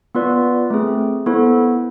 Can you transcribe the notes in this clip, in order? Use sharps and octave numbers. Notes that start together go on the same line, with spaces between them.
B3 F4 B4 D5
A3 C4 G#4
B3 E4 A4 C5